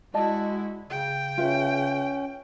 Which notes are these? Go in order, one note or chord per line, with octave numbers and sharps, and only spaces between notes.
G#3 E4 F#4 D5 D#5 A5
C#3 G5
C#4 F4 B4 E5